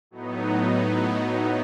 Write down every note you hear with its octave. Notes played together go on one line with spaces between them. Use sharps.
A2 F#3 B3 D#4